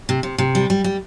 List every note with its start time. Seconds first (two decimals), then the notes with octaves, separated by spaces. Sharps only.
0.09 C3
0.23 C3
0.38 C3
0.55 G3
0.70 G3
0.84 G3